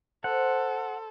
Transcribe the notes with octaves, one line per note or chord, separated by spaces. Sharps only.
A4 C5 F#5